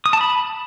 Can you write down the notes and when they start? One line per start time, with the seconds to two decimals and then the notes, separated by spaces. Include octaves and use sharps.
0.06 D#6
0.13 A5
0.21 B5